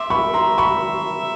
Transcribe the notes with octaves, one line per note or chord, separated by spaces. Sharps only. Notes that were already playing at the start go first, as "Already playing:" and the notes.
Already playing: E5 C6 D6
B5 C#6
A#5 C6
B5 C#6